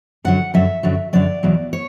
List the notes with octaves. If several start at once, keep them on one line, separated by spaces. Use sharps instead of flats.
F#2 D3 F#3 F#5
F#2 D3 F#3 E5
F#2 D3 F#3
F#2 D3 F#3 D5
E2 B2 F#3
C#5